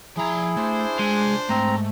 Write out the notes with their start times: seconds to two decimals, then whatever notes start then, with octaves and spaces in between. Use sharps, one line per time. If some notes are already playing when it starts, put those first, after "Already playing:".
0.17 F3 E4 G#4 A#5
0.57 A3 D4 C5
0.99 G#3 F4 G#5
1.49 G#2 A3 C4 A#5